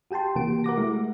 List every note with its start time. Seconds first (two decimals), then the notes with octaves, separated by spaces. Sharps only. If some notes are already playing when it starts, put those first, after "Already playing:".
0.11 F#4 G4 G5 A5 C6
0.36 C3 E3 A#3 F#4 G4 D7
0.64 A#4 F#5 D6 A#6
0.77 G#3 A3 E4